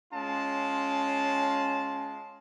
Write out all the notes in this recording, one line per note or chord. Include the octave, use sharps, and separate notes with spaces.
G#3 C#4 F4 A5